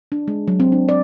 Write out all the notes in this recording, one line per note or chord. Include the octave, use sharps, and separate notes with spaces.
D4
G#3
F#3
C4
D4
D5